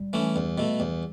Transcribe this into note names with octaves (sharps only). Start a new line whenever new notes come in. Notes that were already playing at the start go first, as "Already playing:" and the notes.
Already playing: G3
E3 A3 C#4
E2
B2 A3
E2